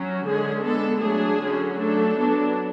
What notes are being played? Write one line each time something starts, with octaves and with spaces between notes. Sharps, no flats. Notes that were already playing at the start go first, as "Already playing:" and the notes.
Already playing: F#3 C#4
D3 G#3 C#4 G#4
G#3 B3 D4 A4
F#3 A3 D4 G#4
D3 F#3 C#4
F#3 A3 D4 A4
F#3 B3 D4